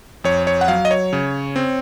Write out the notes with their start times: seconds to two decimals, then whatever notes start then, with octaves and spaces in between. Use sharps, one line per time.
0.24 F2 C#5
0.47 C#5
0.61 F#5
0.68 F#3 F5
0.85 D#5
0.91 C#5
1.13 C#3
1.56 C4